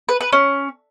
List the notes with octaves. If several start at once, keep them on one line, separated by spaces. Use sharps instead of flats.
B4
B4
C#4